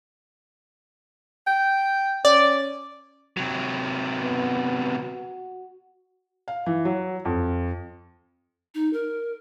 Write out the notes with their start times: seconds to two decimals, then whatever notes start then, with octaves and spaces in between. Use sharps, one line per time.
1.47 G5
2.25 C#4 D5
3.37 C3 F#3
4.18 B3
5.02 F#4
6.48 F5
6.66 E3
6.85 F#3
7.25 F2
8.75 D#4
8.93 A#4